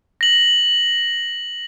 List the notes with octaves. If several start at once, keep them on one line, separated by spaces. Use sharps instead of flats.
A#6 F#7